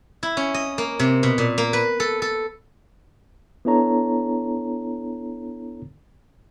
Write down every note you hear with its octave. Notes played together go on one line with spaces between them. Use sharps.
E4
C#4
D#5
A#3
C3
B2
A#2
A#3
B4
A4
A4
B3 D4 E4 A4 C#5 A#5